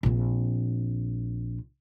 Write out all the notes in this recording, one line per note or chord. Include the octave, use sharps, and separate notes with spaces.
A#1 C4